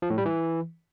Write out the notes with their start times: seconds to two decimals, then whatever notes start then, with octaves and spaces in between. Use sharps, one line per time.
0.02 F3
0.10 A2
0.18 G3
0.25 E3